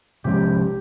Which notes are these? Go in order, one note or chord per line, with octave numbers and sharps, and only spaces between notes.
C3 F3 G#3 C#4 G4